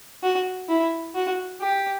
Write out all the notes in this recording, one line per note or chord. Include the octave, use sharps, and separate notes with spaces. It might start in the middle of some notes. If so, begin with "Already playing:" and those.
F#4
E4
F#4
G4